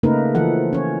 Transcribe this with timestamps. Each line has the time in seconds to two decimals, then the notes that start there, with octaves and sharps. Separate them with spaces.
0.03 C#3 A3 A#3 D#4 A#4 B4
0.35 E3 F3 A4 F#5
0.73 C#4 C#5